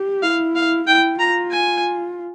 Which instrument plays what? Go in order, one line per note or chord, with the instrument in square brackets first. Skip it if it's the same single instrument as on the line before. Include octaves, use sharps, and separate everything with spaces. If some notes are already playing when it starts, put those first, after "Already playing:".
Already playing: [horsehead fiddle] G4
[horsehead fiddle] E4 [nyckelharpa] F5
[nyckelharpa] F5
[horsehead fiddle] E4 [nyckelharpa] G5
[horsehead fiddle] F4 [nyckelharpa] A#5
[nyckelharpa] G#5